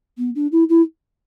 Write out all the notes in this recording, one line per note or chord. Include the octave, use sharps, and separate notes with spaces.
B3
D4
E4
E4